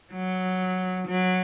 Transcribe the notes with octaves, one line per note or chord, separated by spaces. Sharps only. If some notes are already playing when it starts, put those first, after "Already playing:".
F#3
F#3